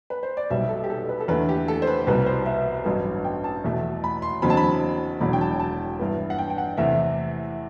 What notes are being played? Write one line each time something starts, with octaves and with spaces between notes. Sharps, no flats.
B4
C5
D5
B1 B2 G3 B3 E5
A4
G4
A4
B4
A4
E2 D3 A3 B4
G4
A4
C5
B4
C2 B2 G3 B3 B4
C5
E5
A1 G2 F#3 B3
G5
A5
E2 B2 A3
B5
C6
F#1 E2 D3 F#3 C4 B5
A5
B5
E1 E2 D3 F#3 B5
G5
A5
A5
G2 E3 B3
F#5
G5
G5
F#5
E2 C3 E3 A3 E5